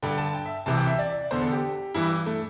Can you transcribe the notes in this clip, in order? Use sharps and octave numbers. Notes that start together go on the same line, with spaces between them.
G2 D3 G5
A5
G5
E5
C2 C3 E3 A5
G5
E5
D5
E2 D3 C5
A4
G4
G2 E3 E4
A3